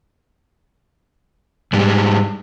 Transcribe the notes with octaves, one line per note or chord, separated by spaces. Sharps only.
G#2 G3 G#3